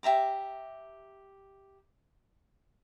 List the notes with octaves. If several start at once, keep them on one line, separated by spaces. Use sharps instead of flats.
G4 E5 A#5 D6